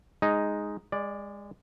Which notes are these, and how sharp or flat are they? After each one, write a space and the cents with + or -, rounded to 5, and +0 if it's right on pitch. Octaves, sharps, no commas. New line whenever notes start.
G#3 +0 D#4 +0
G#3 -25 D5 +0